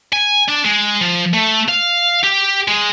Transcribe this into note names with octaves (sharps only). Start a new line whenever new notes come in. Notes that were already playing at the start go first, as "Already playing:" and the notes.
G#5
D4
G#3
F3
A3
F5
G4
G#3